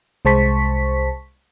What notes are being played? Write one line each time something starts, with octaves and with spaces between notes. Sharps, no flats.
C2 G#3 C5 A5 C#6 B6